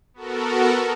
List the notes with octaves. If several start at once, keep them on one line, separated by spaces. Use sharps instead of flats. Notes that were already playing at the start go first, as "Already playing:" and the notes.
B3 F#4 A4 A#4